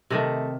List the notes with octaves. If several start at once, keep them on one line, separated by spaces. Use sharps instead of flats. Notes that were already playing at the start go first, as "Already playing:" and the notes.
C3 D#3 A3